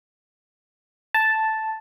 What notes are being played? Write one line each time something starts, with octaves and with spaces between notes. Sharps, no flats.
A5